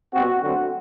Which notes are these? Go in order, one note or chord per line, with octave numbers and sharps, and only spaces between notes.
B2 G3 C4 F#4
D3 F#3 A3 C4 F#4